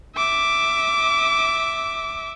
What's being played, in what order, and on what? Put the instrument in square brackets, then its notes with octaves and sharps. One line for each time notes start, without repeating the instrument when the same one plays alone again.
[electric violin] E5 D6